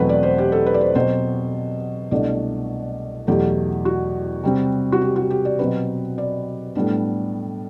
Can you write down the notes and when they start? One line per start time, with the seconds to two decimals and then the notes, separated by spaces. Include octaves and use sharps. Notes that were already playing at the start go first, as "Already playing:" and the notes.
Already playing: E2 B2 F#3 A3 C4 B4
0.09 D5
0.23 C5
0.38 G4
0.52 A4
0.66 B4
0.74 D5
0.81 C5
0.95 B2 F#3 C4 C5
2.11 C2 B2 A3 D4 D5
3.27 E2 B2 F#3 A3 G4
3.85 F#4
4.44 C3 G3 C4
4.92 F#4
5.02 G4
5.16 F#4
5.30 G4
5.45 D5
5.59 B2 F#3 C4 B4
6.18 D5
6.75 A2 G3 B3 D4